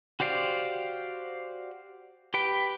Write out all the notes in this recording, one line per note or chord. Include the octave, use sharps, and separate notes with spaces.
F#4 G4 C5 D5 F5
G4 B4 G5